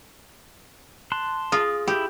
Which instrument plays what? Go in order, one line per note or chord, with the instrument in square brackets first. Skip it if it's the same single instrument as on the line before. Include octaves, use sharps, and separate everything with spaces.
[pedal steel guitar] A5 C6 F#6
[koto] F4 [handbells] G#4 [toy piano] D#6
[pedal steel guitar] E4 [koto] G4